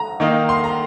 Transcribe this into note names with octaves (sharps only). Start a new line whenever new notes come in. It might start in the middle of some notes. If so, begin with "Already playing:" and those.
Already playing: A#5
D#3 A#3 D#4
C6
A#5